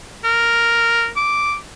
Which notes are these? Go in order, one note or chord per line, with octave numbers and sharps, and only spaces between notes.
A#4
D6